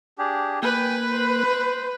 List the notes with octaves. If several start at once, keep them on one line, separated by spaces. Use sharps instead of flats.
D4 G4 G#4
A#3 B4 G5 G#5
C5